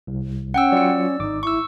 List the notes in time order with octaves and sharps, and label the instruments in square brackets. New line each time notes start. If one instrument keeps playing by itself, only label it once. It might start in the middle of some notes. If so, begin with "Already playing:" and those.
[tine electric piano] C2
[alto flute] C#4 [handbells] F#5 G5 E6
[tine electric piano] F#3 F4 C#7 [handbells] D5 E6
[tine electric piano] G#1 D6 [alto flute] D#4
[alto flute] E4 [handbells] C#6 E6